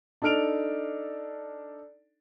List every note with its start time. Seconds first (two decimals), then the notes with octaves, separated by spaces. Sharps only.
0.22 D4 D#4 A4 F6 D7 F7